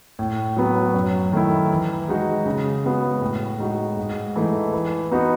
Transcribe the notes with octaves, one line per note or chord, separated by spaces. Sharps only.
A2
F#3 B3 F#4
F#2
D#3 A3 E4
E3
G#3 D#4 F#4
C#3
G#3 B3 F#4
A2
G#3 D#4 F#4
G#2
E3 A3 D#4
E3
B3 D#4 F#4